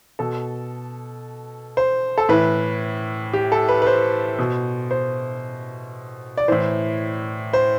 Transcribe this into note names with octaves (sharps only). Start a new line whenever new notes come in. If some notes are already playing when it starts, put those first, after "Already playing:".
B2 A4
C5
A4
A2 E3 B4
G4
A4
B4
B4
C5
B2
C5
D5
A2 E3 C5
C5